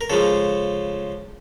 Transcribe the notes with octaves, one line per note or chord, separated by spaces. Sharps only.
A#4
C#3 F3 G#3 A4